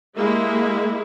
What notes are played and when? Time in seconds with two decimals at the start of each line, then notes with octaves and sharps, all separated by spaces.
0.17 G#3 A#3 E4 G4